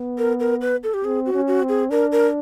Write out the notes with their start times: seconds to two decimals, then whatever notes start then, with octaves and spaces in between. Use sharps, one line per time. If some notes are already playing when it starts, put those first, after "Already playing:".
Already playing: B3
0.18 A#4
0.40 A#4
0.61 B4
0.84 A4
0.94 G4
1.04 C4 G#4
1.26 F#4
1.34 C#4
1.47 F#4
1.62 C4
1.69 G#4
1.90 D4 A#4
2.12 A#4